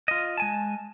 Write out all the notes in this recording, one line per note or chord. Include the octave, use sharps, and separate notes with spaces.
F4 D#5
G#3 G#5 A5